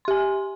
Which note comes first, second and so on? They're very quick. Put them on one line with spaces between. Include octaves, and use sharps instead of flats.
C6 G4 G#5